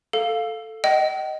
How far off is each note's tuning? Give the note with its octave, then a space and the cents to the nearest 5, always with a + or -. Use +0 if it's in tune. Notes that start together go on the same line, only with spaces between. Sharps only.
A4 +0 F5 +0
D#5 +0 G5 -45